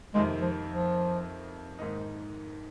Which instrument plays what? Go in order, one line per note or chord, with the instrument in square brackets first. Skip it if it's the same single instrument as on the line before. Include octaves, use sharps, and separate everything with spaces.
[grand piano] F2 C3 D#3 A#3 [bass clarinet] G#3
[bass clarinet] F3
F3
[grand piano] G#2 D#3 A#3 D#4